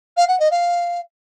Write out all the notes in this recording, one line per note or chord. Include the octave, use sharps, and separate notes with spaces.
F5
F#5
D#5
F5